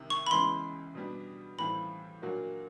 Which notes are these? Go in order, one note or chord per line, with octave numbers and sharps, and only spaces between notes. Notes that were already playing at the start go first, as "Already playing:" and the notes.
Already playing: C2 C3 D#3
C#6
B5
C#2 C#3 E3 G#3 B3 C6
B2 G3 B3 D4
A2 E3 G3 C4 F4 B5
A#2 F#3 A#3 D4 F#4